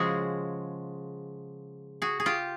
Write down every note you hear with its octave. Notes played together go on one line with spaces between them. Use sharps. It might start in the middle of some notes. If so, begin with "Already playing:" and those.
Already playing: C#3 F3 G#3 F#4 G#4
F#4 G#4
G#4
F4 G4